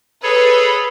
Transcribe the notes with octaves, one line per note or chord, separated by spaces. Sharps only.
G#4 A4 B4 C#5